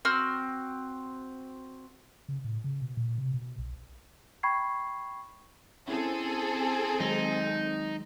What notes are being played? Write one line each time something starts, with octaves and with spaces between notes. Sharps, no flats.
C4 F#4 F6
C#3
A2
C#3
B2
A#2
C3
B2
B1
G5 B5 C#6 G#6 C7
C4 C#4 E4 G#4 A4
D#3 F#3 G#3 D#4